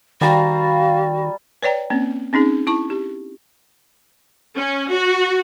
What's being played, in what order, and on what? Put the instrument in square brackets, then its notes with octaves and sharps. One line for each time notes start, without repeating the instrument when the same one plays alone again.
[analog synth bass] D#3 [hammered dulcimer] G3 A5 A#5 [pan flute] F#4 [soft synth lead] F5
[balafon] B4 C#5 D5 G5 A#5
A#3 C4 C#4
C4 C#4 D#4 G#4
E4 A5 C#6
G4
[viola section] C#4
F#4